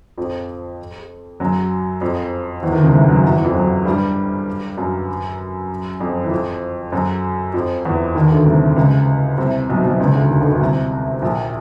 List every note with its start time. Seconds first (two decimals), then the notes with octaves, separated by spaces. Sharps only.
0.18 F2 F3
1.40 F#2 F#3
2.01 F2 F3
2.63 E2 E3
2.73 D#2 D#3
2.83 C#2 C#3
2.93 C2 C3
3.09 F#2 F#3
3.24 E2 E3
3.34 E2 E3
3.44 F2 F3
3.55 F#2 F#3
3.85 G2 G3
4.77 F#2 F#3
6.00 F2 F3
6.24 E3
6.31 F2 F3
6.92 F#2 F#3
7.54 F2 F3
7.85 E2 E3
8.15 D#2 D#3
8.30 D2 D3
8.46 C2 C3
8.76 C#2 C#3
9.38 C2 C3
9.69 B1 B2
9.84 B1 B2
10.00 C#2 C#3
10.14 D2 D3
10.30 D#2 D#3
10.40 D2 D3
10.51 D2 D3
10.60 C2 C3
11.22 A#1 A#2